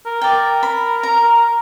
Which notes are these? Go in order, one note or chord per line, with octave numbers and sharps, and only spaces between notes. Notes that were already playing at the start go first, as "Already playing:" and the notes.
A#4
A#4 D5 G5
B5
A#5